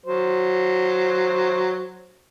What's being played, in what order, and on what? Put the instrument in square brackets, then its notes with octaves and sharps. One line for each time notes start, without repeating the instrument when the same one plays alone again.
[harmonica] F#3 C5